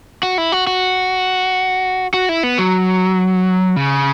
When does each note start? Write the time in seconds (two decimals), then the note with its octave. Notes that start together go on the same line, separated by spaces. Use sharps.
0.23 F#4
0.38 E4
0.52 F#4
0.67 F#4
2.14 F#4
2.29 E4
2.43 B3
2.59 F#3
3.76 C#3